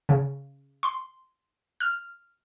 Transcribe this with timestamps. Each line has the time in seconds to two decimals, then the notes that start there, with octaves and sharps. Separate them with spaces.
0.09 C#3
0.83 C6
1.80 F6